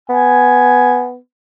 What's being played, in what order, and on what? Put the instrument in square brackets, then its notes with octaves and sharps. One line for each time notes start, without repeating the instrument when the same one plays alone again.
[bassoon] B3 [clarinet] G#5